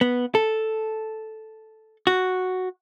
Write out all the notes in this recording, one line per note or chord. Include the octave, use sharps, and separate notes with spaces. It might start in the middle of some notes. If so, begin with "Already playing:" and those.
B3
A4
F#4